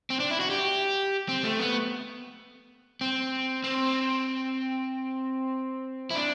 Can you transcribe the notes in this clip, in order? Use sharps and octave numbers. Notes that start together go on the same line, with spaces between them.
C4
D4
E4
F#4
G4
C4
A3
B3
C4
C4
E4
D4